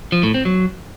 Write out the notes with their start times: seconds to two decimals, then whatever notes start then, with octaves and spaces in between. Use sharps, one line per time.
0.12 F3
0.23 A2
0.34 C4
0.45 F#3